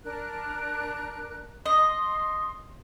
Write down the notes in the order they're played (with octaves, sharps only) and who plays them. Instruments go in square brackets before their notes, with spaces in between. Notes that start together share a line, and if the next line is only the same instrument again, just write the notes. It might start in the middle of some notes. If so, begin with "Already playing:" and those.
[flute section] D4 A#4 F#6
[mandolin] D#5 [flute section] C6